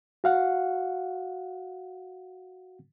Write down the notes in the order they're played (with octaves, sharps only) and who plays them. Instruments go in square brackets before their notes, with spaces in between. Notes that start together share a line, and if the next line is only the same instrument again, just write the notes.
[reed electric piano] F#4 F5 F#5